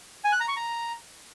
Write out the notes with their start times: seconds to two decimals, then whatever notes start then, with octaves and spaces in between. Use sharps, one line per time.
0.24 G#5
0.32 F#6
0.40 A#5
0.48 C#6
0.56 A#5